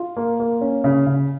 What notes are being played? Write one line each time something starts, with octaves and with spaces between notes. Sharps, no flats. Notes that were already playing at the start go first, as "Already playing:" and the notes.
Already playing: F4
A#3
A#3
C#4
C#3
C#3